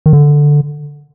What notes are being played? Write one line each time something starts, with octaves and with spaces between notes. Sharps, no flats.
D#3
D3